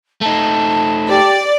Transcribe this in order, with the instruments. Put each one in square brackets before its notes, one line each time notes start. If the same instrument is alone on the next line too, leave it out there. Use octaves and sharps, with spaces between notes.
[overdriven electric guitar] A3 D#4 [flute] A5
[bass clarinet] G4 [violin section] D5